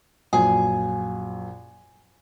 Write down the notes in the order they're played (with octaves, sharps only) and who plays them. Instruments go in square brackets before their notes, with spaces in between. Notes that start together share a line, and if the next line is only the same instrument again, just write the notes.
[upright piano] A#1 F#2 [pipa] G#4